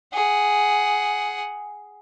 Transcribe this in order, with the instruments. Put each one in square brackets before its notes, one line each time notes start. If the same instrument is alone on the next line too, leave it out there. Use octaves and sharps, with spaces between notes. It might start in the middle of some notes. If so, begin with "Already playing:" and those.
[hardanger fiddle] G#4 F#5